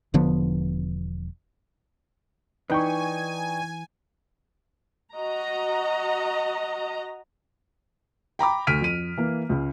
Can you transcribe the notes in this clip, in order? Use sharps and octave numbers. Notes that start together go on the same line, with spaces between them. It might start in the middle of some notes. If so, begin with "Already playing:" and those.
E1 D3 F3 B3
E3 D#4 B4 D5 G5 G#5 C#6
F#4 D#5 A#5
G5 A#5 B5 D6
D2 F6 B6 D7 D#7
F2 D#7
E3 A#3
C#2 C#3